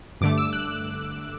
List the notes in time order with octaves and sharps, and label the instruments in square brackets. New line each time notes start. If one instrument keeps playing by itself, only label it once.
[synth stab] G2 D3 A3 D6
E6
F#6